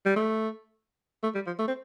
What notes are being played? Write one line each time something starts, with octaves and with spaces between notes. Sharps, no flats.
G3
A3
A3
G3
F3
A3
C4